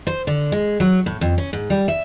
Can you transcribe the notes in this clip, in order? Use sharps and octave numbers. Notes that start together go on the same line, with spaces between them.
C5
D3
G#3
F#3
A2
F2
C#4
G#2
G3
E5